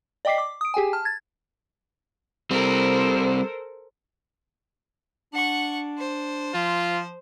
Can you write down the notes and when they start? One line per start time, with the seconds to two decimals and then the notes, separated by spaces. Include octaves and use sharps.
0.25 D5 D#5 G5 D6 B6 C7
0.38 D6
0.61 D#6 D7
0.74 G4 G#4 G5 G#5
0.93 A5 F6
1.05 G#6 A6
2.51 G3 C4 A4 A#4 C5
5.33 D4 F#5 C#6
5.98 C5
6.54 F3 F4